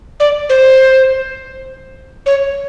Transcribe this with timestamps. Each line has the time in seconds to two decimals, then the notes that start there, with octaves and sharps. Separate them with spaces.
0.20 D5
0.49 C5
2.26 C#5